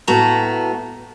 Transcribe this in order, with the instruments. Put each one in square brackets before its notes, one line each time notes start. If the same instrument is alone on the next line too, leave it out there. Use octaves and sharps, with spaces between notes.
[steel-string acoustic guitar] A2 B3 F#4 A5 A#5